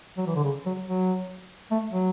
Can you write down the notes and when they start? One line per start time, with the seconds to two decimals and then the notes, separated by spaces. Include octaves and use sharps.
0.18 F#3
0.27 E3
0.36 D3
0.44 C#3
0.66 F#3
0.87 F#3
1.71 A3
1.92 F#3